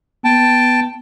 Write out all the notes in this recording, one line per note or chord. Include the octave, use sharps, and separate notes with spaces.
B3 G5 A5